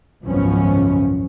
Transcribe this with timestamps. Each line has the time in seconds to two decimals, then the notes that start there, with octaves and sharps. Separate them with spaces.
0.23 G#1 C#2 F#2 F3 B3 C#4